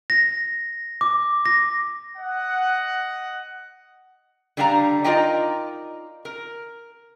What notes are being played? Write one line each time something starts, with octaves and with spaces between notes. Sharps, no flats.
A#6
D6
A#6
D#5 F#5
D3 G3 D4 F5 G5 A#5
D#4 F4 A#4 D5 D#5 G5
A#4